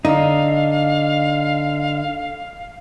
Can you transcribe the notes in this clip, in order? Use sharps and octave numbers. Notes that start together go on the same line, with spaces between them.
D3 D#4 F5